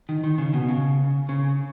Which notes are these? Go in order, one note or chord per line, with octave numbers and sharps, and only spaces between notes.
D#3
D#3
C#3
B2
C#3
C#3